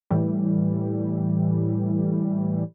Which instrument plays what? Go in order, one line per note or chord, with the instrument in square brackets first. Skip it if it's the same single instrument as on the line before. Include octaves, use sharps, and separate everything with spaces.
[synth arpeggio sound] A2 E3 G3